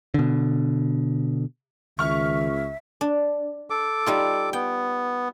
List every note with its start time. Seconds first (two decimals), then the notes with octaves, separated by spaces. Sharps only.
0.14 B2 D3
1.99 C#2 D#3 E5 C#6 F6
3.01 D4
3.70 A4 D6
4.06 G3 D#4 F4
4.53 B3 G5